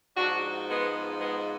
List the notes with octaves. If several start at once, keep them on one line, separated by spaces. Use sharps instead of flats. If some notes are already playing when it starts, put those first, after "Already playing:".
G#2 F3 D4 F#4
G#3 B3
G#3 B3